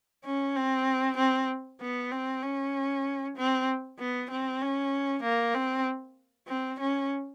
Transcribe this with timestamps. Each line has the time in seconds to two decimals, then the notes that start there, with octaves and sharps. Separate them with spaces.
0.25 C#4
0.56 C4
1.18 C4
1.81 B3
2.12 C4
2.43 C#4
3.37 C4
3.99 B3
4.31 C4
4.62 C#4
5.23 A#3
5.54 C4
6.48 C4
6.80 C#4